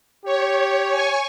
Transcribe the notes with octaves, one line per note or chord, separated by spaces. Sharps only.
G4 C#5
G#5 C#6